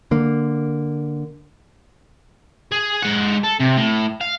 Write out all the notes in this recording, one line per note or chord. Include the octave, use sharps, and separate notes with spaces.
D3 A#3
G#4
G#3 F#5
A4
C3
A2
F5